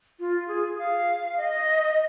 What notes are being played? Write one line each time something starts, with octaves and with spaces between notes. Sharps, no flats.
F4
G#4
F5
D#5